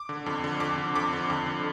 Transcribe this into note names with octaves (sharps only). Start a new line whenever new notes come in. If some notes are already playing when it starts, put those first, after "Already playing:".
Already playing: D6
D3
F2
D3
F2 D6
D3
F2 D6
D3
F2
D3